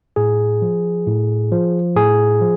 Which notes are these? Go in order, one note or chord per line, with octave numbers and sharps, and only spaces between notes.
A2 G#4
F3
A2
F3
A2 G#4
F3